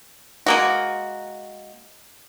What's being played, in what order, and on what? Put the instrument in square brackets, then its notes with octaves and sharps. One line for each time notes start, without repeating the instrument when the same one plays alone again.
[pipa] G#3 A#3 F#4